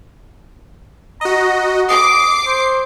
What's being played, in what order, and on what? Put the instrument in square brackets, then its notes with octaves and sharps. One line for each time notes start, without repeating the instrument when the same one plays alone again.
[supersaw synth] F#4 D#5 [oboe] A#5
[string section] D6 [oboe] D#6 [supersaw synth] C7
[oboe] C5